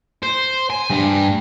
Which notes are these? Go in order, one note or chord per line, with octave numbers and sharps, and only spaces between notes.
C5
G#5
G2